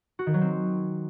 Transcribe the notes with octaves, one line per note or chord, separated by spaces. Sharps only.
F#4
D#3
F#3
C4